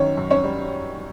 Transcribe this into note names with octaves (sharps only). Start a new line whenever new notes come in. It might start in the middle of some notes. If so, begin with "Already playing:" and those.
Already playing: F#2 D#3 C#4 C#5
F#2
C#4 C#5
G3